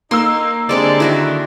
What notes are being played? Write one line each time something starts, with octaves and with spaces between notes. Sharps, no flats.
A#3 D#4 C6 E6
D3 G3 G#3 C4 D4 A4 D5
F2 D#3 E4 F#4 D5